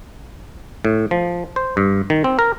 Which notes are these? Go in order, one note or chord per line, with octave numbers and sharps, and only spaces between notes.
A2
F3
C5
G2
D#3
C4
A#4